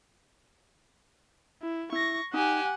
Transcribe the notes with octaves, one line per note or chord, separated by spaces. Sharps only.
E4
E4 C#6 A#6
D#4 G4 F#5 G#5